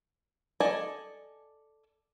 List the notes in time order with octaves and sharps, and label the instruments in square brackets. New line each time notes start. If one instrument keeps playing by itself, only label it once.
[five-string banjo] A4 D5 D#5 G#5 A5